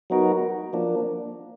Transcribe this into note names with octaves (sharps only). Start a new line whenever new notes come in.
F#3 B3 D#4 F#4 A#4
F3 A#3 D4